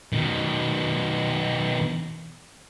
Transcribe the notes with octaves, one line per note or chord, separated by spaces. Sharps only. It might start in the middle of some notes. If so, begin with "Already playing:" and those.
B2 D#3